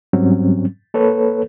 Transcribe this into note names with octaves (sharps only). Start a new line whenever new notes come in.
G#2 F#3 G3 C4 C#4
A#3 A4 B4 C#5